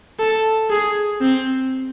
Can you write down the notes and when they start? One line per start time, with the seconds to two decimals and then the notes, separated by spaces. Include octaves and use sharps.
0.19 A4
0.70 G#4
1.21 C4